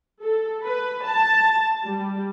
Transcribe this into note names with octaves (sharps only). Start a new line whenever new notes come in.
A4
B4
A5
G3